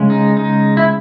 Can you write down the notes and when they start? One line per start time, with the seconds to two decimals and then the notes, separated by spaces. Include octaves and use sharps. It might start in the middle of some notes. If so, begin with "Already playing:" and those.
Already playing: C#3 G#3 C#4
0.10 D#4
0.37 D#4
0.77 E4